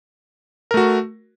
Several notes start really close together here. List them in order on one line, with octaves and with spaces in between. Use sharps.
A#4 A3 F#4